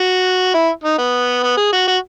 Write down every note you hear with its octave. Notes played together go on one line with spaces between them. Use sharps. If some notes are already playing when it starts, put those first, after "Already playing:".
Already playing: F#4
E4
D#4
B3
B3
G#4
F#4
F#4